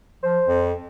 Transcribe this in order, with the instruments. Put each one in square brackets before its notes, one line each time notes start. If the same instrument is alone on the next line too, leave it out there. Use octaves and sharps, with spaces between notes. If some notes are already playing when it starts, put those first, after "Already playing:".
[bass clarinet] F3 [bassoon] C5
[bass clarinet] F2